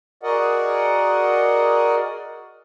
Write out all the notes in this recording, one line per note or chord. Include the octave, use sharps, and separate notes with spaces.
F#4 G#4 A#4 D5 D#5 F#5